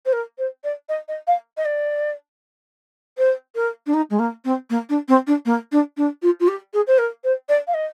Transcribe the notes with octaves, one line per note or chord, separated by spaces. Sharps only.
C5
A#4
C5
D5
D#5
D#5
F5
D#5
D5
C5
A#4
D4
D#4
G#3
A#3
C4
A#3
D4
C4
D4
A#3
D4
D4
F4
F4
G4
G#4
C5
A#4
C5
D5
F5
D#5